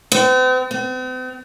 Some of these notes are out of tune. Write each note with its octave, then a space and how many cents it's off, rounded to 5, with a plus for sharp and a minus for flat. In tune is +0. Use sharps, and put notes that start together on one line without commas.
C4 -45
C4 -45